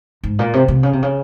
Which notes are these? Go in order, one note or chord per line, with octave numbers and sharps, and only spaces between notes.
G#2
A#2
C3
C3
C#3
C3
C#3